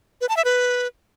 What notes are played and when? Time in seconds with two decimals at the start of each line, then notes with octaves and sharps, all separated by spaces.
0.21 B4
0.29 A5
0.37 E5
0.45 B4